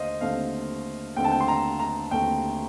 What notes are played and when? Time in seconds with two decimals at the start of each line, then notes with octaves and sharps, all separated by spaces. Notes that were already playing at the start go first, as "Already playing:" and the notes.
Already playing: D#2 D3 A3 C5 D#5 F5
0.21 D#2 D3 A3 C4 F5
1.16 D#2 D3 A3 C4 G5
1.24 A5
1.32 G5
1.40 C6
1.48 A#5
1.80 A#5
2.11 D#2 D3 A3 C4 G5